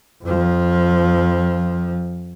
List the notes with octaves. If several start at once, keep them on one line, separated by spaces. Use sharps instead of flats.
F2 F3